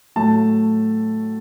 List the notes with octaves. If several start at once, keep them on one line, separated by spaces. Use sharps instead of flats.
A2 F#3 A3 A5